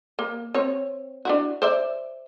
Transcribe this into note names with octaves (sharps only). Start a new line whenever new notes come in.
A#3
C4 C#5
D4 E4 F#4
C5 D5 E5